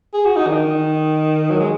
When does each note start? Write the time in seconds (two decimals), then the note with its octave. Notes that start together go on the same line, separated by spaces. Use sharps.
0.14 G#4
0.25 F#4
0.36 D#4
0.47 D#3
1.50 F#3
1.60 G#3